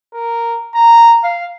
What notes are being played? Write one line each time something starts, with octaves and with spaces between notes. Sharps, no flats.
A#4
A#5
F5